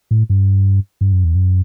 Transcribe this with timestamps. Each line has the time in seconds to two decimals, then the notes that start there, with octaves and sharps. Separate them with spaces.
0.11 A2
0.30 G2
1.01 G2
1.12 F#2
1.24 E2
1.35 F#2